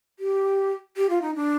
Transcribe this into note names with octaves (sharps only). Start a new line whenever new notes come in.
G4
G4
F4
D#4
D4